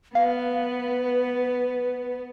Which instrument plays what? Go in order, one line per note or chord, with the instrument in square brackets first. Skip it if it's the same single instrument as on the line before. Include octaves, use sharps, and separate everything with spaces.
[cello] B3 [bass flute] B4 [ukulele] F5